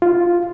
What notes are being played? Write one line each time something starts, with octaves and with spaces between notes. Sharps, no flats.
F4